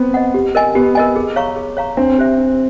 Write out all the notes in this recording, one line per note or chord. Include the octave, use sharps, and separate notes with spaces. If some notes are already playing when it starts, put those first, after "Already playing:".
Already playing: B3 C4
D#5 F#5
G4
A#4 D#5 G#5
B3 G4
A#4 D#5 G#5
G#4
C#5 F5 A#5 C#6
G#4
C#5 F5 A#5 C#6
C4 D4
G4 C5 E5
D4